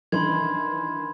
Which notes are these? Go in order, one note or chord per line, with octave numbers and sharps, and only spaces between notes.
D#3 E3 D4 B5 C6 G#6